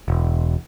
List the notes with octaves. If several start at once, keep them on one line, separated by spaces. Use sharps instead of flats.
E1